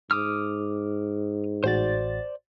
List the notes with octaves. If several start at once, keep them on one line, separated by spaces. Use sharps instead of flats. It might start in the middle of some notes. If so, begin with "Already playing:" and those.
G#2 D6 D#6 F6
A1 F#4 C5 D5 A6